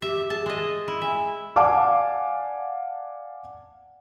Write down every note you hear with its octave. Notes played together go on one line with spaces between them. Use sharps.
G4 E5
G#4 A5
G#3 D#5
E4
E5 G#5
D5 F5 F#5 G#5 A5 D6